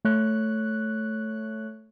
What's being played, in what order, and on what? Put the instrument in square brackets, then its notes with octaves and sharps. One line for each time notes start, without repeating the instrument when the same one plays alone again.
[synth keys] A3 C#5 F#6